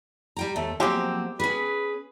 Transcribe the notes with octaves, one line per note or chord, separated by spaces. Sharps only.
G3 G5 A#5
D#2 A3
F3 F#3 G#3 A#3 C4 G4
C#4 G#4 B4